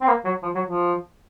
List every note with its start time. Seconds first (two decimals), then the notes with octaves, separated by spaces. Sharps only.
0.01 C4
0.07 A#3
0.25 F#3
0.43 F3
0.55 F#3
0.66 F3